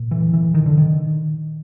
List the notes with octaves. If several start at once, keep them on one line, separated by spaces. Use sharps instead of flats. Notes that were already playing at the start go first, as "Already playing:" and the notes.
Already playing: A#2
E3
E3
D#3
D3
D#3